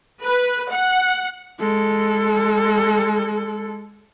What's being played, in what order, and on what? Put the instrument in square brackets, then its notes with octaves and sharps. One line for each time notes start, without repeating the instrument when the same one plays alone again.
[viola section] B4
F#5
[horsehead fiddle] G#3 A4